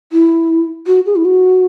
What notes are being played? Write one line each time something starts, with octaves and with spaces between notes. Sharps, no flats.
E4
F#4
G#4
E4
F#4